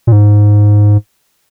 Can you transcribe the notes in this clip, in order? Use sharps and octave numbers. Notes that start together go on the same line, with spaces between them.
A#2
G#2